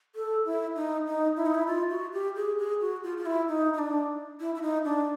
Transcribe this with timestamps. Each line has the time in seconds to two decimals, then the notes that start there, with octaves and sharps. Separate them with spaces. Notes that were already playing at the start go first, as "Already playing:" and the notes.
0.15 A4
0.45 E4
0.76 D#4
1.07 D#4
1.37 E4
1.46 D#4
1.55 E4
1.67 F4
1.90 F#4
2.13 G4
2.36 G#4
2.58 G#4
2.81 F#4
3.04 F4
3.17 F4
3.26 E4
3.48 D#4
3.73 D#4
3.79 D4
4.40 E4
4.55 E4
4.62 D#4
4.85 D4